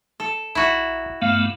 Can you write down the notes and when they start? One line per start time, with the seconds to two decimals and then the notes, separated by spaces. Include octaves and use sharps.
0.20 A4
0.55 A#1 E4 F#4
1.22 G2 A3 B3 F5